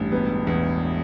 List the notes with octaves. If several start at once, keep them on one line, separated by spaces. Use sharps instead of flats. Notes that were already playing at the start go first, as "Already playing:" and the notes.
Already playing: A1 G2
E1 B3
E2